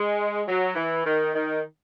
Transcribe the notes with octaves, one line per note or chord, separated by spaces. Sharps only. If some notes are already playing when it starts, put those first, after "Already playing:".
Already playing: G#3
F#3
E3
D#3
D#3